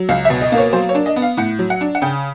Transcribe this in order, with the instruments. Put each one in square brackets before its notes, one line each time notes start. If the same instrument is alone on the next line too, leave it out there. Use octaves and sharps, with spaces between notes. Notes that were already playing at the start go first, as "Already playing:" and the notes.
Already playing: [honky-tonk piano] F#3
C#2 F5
E5
B2
D#5
A#3
C#5
F#3 C5
C#5
D4
D#5
B3
F5
A2 F#5
F#3
F#5
D4
F#5
C#3 G5